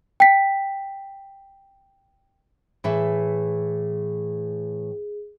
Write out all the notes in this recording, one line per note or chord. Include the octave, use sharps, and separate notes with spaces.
G5 B6
A2 E3 G#4 E5